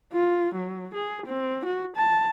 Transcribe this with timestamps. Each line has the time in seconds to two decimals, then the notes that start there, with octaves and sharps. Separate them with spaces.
0.13 F4
0.54 F#3
0.94 G#4
1.26 C4
1.65 F#4
1.96 A5